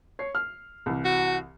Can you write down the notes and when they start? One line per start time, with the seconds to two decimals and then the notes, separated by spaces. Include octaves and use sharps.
0.19 C#5 C7
0.35 F6
0.86 C2 E3
1.05 F#4